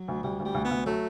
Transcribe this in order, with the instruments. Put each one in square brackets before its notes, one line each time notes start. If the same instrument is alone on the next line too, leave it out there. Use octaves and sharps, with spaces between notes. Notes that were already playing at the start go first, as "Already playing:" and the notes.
Already playing: [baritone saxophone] F#3
[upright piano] D2
[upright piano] D2 [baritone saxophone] G3
[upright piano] D2
[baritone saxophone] G3
[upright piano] D2
[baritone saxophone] B3
[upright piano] D2
[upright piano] F#3 [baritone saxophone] A3